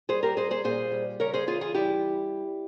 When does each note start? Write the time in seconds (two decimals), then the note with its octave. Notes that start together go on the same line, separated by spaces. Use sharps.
0.09 G3 G#4 C5
0.23 G4 A#4
0.37 G3 G#4 C5
0.51 G#4 C5
0.64 A#2 G#4 C5
0.92 G3
1.20 C#3 A#4 C#5
1.34 G#4 C5
1.47 E3 F4 G#4
1.61 F4 G#4
1.74 G3 E4 G4